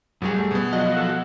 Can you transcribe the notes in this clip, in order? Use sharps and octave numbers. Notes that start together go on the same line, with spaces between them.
A1 F#2 G3 F#4 G#4
A3
B2 B3
F3 F#3 F#4 D#5
A4